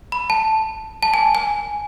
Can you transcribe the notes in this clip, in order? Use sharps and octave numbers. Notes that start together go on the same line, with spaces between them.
B5
A5
A5
G#5
G#5